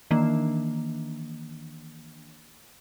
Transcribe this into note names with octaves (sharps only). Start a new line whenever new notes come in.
D#3 E3 A#3 D4